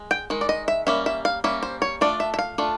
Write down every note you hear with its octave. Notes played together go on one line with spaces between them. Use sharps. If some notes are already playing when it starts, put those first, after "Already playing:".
Already playing: G#3
G5
D#3 G#3
D5
D#5
E5
G3 A#3 C#4 E5
E5
F5
G3 A#3 C#4 E5
C5
C#5
A3 D4 F4 D5
E5
E5
F5
A3 D4 F4